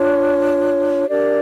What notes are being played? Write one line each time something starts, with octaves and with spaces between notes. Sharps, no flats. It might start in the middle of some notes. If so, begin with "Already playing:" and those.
Already playing: D4 F4 C#5
D4 G4 A#4 D5